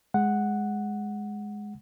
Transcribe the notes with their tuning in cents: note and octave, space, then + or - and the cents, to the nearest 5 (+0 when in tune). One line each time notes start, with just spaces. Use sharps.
G#3 +0 F#5 +0